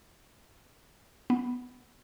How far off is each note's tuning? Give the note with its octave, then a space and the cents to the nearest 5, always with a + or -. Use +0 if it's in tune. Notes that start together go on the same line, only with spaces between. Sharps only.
B3 +0